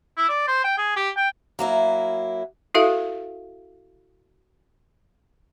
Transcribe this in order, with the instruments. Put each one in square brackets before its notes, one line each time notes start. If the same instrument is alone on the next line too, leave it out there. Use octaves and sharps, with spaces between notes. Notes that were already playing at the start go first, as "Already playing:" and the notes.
[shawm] E4
D5
C5
G5
G#4
G4
G5
[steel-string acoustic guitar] F#3 A#3 E4
[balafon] E4 F#4 A4 E5 F5